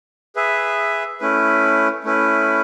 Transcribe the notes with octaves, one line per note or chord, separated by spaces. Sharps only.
G#4 B4 E5
A3 C#4 E4 B4
A3 C#4 E4 B4